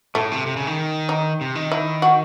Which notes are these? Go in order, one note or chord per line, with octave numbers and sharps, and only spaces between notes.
A2 A3
C3
C3
C#3
D#3
D#4
C3
D#3
E4
F#4